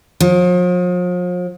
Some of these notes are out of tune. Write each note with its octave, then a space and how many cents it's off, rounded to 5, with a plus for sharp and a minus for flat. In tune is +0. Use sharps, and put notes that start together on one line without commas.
F3 +40